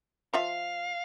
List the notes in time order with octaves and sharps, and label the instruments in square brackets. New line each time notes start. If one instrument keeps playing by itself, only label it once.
[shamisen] F3 F4 E5 [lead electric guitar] F5